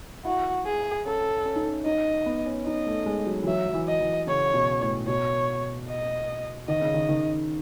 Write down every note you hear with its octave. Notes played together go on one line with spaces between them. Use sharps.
E4 F#4
G#4
C#4 A4
C#4
D#4
C#4
D#4 D#5
B3
C#4
D#4 D#5
A3
G#3
F#3
E3
F#3 E5
F#3
E3
D#5
E3
C#3 C#5
B2
A2
B2 C#5
D#5
D#3 D#5
C#3
D#3
D#3